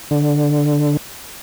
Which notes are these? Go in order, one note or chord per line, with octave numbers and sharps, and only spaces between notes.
D3